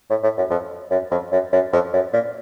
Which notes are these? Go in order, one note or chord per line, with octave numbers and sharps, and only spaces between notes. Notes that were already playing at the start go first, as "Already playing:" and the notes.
A2
A2
F#2
F2
F#2
F2
F#2
F#2
F2
F#2
A#2